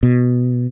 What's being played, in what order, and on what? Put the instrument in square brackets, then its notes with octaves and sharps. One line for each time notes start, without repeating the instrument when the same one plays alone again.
[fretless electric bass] B2